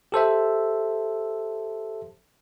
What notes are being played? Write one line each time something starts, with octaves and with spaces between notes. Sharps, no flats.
G4 A4 C5 E5